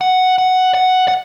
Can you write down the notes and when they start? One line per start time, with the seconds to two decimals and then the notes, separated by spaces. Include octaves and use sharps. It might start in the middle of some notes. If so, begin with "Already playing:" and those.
0.01 F#5
0.38 F#5
0.74 F#5
1.08 F#5